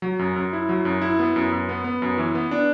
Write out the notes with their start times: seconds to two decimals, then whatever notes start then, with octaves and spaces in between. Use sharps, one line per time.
0.02 F#3
0.19 F#2
0.36 F#2
0.53 E4
0.69 F#3
0.85 F#2
1.01 E4
1.19 B3
1.36 F#2
1.52 F#2
1.69 B3
1.84 B3
2.02 F#2
2.18 E3
2.35 B3
2.51 D4